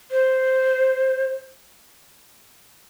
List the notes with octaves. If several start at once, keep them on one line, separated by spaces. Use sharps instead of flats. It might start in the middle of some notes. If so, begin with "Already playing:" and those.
C5